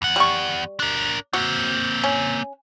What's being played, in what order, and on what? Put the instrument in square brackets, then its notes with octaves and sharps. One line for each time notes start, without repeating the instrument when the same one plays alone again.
[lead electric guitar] E2 F#5
[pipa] G3 C#6
[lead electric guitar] D4 A#4
[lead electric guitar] A#3 C4 [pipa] F#4
[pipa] C#4